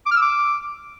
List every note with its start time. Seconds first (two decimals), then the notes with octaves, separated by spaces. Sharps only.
0.06 D6
0.11 F6
0.17 E6
0.22 D6